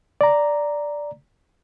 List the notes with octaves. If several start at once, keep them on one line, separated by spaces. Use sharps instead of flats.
D5 A#5